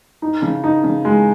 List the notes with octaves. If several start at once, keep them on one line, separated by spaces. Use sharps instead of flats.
D#4
C#3
D#4
C#3
G#3